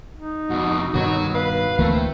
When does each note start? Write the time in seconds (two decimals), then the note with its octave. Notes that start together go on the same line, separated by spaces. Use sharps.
0.17 D#4
0.50 F2 B2 F#4
0.94 G2 B2 D#3 B3 F#4 C#5
1.35 B4 F5
1.79 D2 E3 A3 A#3 C4